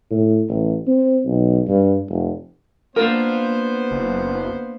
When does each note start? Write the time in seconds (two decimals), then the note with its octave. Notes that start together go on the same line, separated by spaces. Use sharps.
0.11 A2
0.49 A1
0.87 C4
1.26 B1
1.68 G2
2.09 F1
2.96 A#3 B3 D4 F4 A#4 C5
3.91 F#1